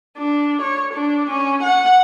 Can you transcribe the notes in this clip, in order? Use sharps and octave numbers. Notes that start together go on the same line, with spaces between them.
D4
C#5
D4
C#4
F#5